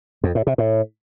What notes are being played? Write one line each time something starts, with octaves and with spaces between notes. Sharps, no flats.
F2
A2
C3
A2